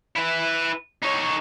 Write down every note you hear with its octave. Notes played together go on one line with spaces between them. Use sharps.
E4 B4
D#4 C#5